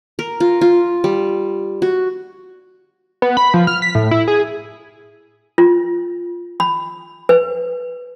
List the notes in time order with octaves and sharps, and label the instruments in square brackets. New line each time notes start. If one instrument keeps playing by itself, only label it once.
[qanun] A#4
F4
F4
G3
F#4
[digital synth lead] B3
B5
F3
F6
B6
A2
E4
G#4
[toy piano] F4
B5
B4